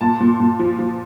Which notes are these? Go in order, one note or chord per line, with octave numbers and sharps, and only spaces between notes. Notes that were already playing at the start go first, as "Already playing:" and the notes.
A#2 A5
A#2
A#2
F3
F3